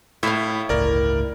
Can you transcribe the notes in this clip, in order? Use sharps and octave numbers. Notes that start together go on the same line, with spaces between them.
A2 E4 F5
G1 C#2 A2 A#4 D5